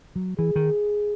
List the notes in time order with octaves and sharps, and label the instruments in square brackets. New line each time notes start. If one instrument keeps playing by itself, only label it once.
[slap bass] F#3
[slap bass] E3 [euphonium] G#4
[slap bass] D#3